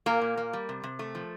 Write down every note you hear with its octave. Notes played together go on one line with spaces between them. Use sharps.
A#2 A#3 A#4
A#2
A#3
G3
C3
C3
A3
F3